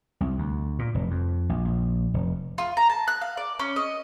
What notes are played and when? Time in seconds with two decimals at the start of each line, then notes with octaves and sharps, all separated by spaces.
0.21 C2
0.38 D2
0.79 A#2
0.95 F1
1.11 F2
1.49 A#1
1.65 A#1
2.14 F1
2.58 F4
2.77 A#5
2.90 A5
3.08 F#6
3.21 F5
3.37 D5
3.59 C#4
3.76 D#5